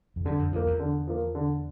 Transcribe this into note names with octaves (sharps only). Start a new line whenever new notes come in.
F2
E2 G2 D3
F2
E2 F3 A#3
E2
D3
F3 A#3
D3